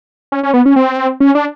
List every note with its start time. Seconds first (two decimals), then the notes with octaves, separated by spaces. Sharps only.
0.32 C#4
0.43 C#4
0.54 B3
0.66 C#4
0.76 C4
1.20 C#4
1.35 D4